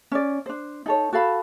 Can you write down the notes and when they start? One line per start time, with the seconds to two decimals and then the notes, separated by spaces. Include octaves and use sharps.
0.12 C#4 D5
0.46 D4 C5
0.86 D#4 A4 C#5
1.13 F#4 A4 F5 B5